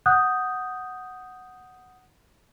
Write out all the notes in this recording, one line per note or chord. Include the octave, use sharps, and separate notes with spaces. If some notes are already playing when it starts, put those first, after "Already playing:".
F#5 D#6 F#6 G6